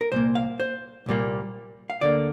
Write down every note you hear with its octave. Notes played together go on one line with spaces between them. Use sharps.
A#4
C2 A#2 A#3 C5
F5
C5
C2 A#2 G3 A#3
F5
D2 D3 A#3 D5